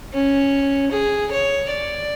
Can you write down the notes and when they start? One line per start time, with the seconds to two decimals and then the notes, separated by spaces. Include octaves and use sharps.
0.13 C#4
0.92 G#4
1.31 C#5
1.70 D5